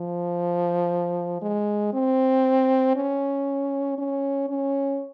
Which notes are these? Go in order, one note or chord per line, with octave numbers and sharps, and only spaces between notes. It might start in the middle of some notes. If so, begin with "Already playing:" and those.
Already playing: F3
G#3
C4
C#4
C#4
C#4